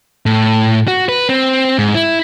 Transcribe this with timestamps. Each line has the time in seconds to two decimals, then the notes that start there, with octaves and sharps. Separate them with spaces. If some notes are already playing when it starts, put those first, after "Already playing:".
0.26 A2
0.88 F#4
1.09 B4
1.29 C4
1.79 G#2
1.95 E4